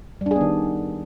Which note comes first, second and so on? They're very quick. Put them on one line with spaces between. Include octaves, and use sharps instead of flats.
G3 D4 G#4 B3 D#3